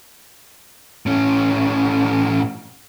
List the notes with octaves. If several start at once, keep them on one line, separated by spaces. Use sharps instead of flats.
A2 C#4